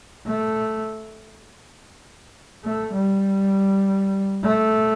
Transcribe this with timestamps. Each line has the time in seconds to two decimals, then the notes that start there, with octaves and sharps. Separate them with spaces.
0.26 A3
2.64 A3
2.94 G3
4.43 A3